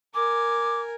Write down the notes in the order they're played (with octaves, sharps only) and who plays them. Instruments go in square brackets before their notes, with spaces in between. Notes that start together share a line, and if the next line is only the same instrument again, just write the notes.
[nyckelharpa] A#4 G#5 [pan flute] D6